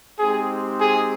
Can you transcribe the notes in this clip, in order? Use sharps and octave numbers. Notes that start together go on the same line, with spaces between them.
G#3 C4 D#4 G4 G#4
G#4